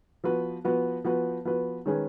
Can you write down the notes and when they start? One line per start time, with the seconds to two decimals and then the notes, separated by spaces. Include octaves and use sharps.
0.24 F3 B3 F#4 B4
0.64 F3 B3 F#4 B4
1.04 F3 B3 F#4 B4
1.45 F3 B3 F#4 B4
1.86 D#3 G#3 C#4 G#4 B4